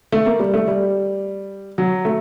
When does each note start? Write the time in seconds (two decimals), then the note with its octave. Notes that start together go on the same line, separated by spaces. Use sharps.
0.12 A3
0.26 A#3
0.39 G3
0.54 A3
0.67 G3
1.78 F#3
2.05 A3